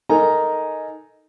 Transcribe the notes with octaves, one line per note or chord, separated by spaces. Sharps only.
D#4 A4 A#4 G#5 A#5